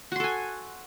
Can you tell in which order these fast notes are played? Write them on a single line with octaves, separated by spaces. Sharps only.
F#4 C6 A4 G#5